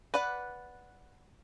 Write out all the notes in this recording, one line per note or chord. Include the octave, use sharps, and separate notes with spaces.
B4 D5 F#5